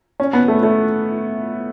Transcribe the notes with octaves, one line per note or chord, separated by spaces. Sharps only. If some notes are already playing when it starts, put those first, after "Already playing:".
C#4
B3
A3
A3